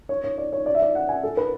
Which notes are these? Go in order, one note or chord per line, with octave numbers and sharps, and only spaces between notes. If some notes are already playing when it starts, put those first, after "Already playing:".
C#5
C#5
D5
C#5
D5
E5
D5
F#5
G#5
A4
B4